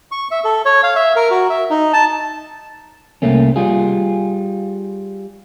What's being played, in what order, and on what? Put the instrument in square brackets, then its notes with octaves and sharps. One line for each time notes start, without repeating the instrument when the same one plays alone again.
[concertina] C#6
E5
A4
C#5
F5
E5
A#4
F#4
E5
D#4
A5
[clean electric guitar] C2 A3 A#3 C#4
G3 F4 G#4